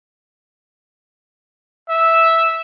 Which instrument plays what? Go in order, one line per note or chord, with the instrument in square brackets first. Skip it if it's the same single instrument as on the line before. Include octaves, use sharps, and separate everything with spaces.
[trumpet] E5